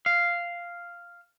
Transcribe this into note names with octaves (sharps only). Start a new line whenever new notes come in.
F5